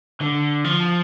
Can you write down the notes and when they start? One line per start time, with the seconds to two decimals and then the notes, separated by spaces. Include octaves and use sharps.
0.21 D3
0.64 F3